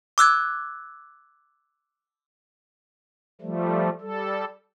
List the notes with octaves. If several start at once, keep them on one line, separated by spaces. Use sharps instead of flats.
D6 E6 F#6 G#6
F3 G3 A3
G3 A4